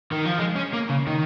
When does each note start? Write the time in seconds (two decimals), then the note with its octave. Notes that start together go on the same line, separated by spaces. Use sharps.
0.12 D#3
0.25 F3
0.38 G#3
0.55 C#4
0.73 A#3
0.89 C#3
1.07 D#3